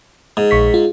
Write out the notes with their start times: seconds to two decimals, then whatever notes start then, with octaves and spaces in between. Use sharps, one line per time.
0.37 G#2
0.51 A#1 C#6 B6
0.74 F4